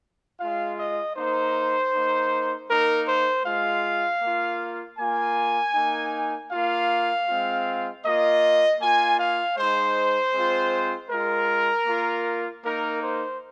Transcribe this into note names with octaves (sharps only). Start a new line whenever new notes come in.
G#3 F4 F5
D#5
A#3 D#4 C5
A#3 D#4
A#3 D#4 A#4
C5
G#3 F4 F5
A#3 F4
A#3 F4 G#5
A#3 D#4
A#3 F4 F5
G#3 C4 F4
A#3 F4 D#5
A#3 F4 G#5
F5
G#3 D#4 C5
G#3 C4 F4
G#3 F4 A#4
A#3 F4
A#3 D#4 A#4
C5